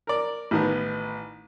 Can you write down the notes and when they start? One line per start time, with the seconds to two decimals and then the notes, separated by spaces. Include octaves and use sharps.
0.07 A#4 D5
0.51 A1 D#3 B3